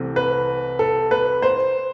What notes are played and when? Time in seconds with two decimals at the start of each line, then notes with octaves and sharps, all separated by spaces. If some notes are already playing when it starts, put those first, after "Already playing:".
Already playing: C2 C3 E3 A3 C4
0.16 B4
0.79 A4
1.11 B4
1.42 C5